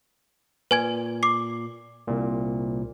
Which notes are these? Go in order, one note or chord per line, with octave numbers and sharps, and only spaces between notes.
A#2 B4 G#5 G#6
D6 C7
C2 A#2